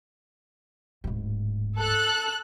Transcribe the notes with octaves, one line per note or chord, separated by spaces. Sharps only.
D1 G#2
A4 F#6